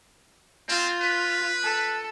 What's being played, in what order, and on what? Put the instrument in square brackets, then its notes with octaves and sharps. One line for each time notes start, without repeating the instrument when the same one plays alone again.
[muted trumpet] C4 [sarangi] F4
[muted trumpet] B4
[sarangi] A4